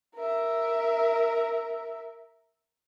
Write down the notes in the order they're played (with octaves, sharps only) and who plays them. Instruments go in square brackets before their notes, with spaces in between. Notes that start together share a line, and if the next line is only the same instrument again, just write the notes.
[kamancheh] A#4 E5